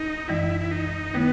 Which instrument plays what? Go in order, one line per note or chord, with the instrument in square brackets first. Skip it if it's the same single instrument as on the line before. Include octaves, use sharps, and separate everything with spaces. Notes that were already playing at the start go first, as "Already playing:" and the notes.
Already playing: [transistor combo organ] D#4
[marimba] F#2 E3 G#3 [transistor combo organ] E4
[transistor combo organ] E4
D#4
[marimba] D#3 A3 E4 [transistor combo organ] B3